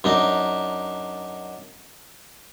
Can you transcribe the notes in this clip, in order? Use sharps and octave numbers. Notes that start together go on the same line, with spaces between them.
F#2 D4 D#4